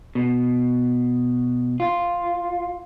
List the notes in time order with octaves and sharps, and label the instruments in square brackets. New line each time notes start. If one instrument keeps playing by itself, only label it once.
[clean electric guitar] B2
F4